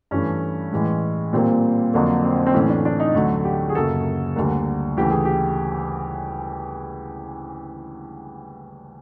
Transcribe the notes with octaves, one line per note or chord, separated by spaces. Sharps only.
G2 E3 A3 C#4
A2 E3 G#3
A#2 G3 A#3 C4
F2 D3 F#3 A#3
C4
C4
A2 E3 A3 C#4
D4
D4
D#4
D2 D3 F#3 A3
G4
G#4
F#2 C#3 F#3 A#3 A4
D2 D3 G3 A#3 A#4
D2 C#3 E3 A3 G4
G#4
G4